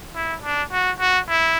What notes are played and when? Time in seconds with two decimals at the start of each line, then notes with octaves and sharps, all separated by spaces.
0.15 E4
0.43 D4
0.72 F#4
1.00 F#4
1.28 E4